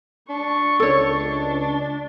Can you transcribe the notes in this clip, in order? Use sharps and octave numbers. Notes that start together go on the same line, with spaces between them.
D4 C#6
C#2 A4 C#5